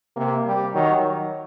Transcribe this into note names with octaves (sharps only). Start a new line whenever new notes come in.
C3 A#3
G3
D#3 F#3